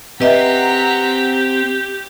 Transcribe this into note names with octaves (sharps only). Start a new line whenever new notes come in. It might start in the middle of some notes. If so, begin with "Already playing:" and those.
C4 G4 B4 D#5 E5 F#5 A#5 B6